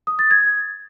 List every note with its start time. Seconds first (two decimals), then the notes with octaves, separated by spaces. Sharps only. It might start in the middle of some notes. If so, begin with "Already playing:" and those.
0.07 D#6
0.19 A6
0.31 G#6